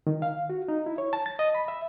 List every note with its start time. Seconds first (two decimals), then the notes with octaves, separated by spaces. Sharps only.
0.07 D#3
0.22 F5
0.50 F#4
0.68 D#4
0.86 E4
0.98 C#5
1.13 A5
1.26 A6
1.39 D#5
1.55 B5
1.68 E5